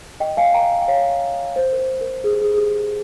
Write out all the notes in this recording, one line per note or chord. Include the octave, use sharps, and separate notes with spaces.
D#5 G5
F5 G#5
G5 A#5
G5
C#5 F5
C5
A#4
C5
A#4
G#4
G4
G#4
G#4
G4